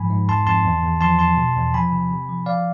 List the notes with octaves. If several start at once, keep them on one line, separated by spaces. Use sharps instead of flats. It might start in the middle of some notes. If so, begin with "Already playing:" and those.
Already playing: G#2 F3 G#5 B5
G#2
F2 A5 C6
F2 A5 C6
E2
E2
F3 A5 C6
F2 A5 C6
B2
E2
F3 G#5 B5
C3
C3
F3
F3 D5 F5